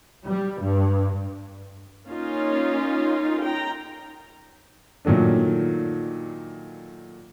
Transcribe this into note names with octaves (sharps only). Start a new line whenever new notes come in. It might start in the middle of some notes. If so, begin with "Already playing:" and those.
G3
G2
A#3 C#4 D#4 F4
G5 A#5
A#2 D#3 F#3 A3 D4